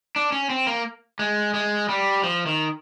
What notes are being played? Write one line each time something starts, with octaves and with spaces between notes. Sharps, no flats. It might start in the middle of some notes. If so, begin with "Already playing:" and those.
D4
C#4
C4
A#3
G#3
G#3
G3
F3
D#3